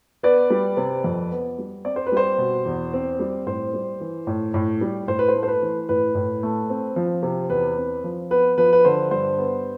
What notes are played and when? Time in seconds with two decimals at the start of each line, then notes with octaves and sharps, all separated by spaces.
0.23 B3 B4 D5
0.50 G3
0.77 C3
1.04 F2
1.32 B3
1.58 G3
1.85 C4 D5
1.96 C5
2.07 B4
2.12 G3 C5
2.38 B2
2.66 E2
2.93 C4
3.20 G3
3.47 A2 C5
3.74 G3
4.00 E3
4.27 A2
4.54 A2
4.81 G3
5.07 A2 C5
5.19 B4
5.28 C5
5.35 A3
5.43 C5
5.48 B4
5.62 E3
5.89 A2 B4
6.15 A2
6.43 A3
6.70 C4
6.96 F3
7.23 C3
7.50 E2 B4
7.77 C4
8.04 F3
8.30 B3 B4
8.58 F3 B4
8.73 B4
8.85 D3 C5
9.11 G2 C5
9.38 B3